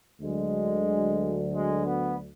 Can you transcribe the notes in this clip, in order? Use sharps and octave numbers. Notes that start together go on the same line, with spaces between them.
D2 D3 F#3 G#3
G#3
B3